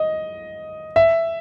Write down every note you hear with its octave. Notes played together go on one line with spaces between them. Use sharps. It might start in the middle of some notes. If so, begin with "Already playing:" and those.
Already playing: D#5
E5